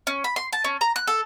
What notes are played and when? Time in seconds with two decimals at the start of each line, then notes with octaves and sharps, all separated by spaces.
0.07 C#4
0.24 B5
0.36 C6
0.53 A5
0.64 C#4
0.81 A#5
0.96 F#6
1.07 A4